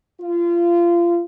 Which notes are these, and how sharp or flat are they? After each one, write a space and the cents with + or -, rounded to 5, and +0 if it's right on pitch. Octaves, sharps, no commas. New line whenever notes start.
F4 -25